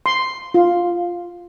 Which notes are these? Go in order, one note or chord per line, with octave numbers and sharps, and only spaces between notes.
C6
F4